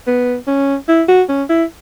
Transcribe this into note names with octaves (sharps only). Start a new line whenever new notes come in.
B3
C#4
E4
F#4
C#4
E4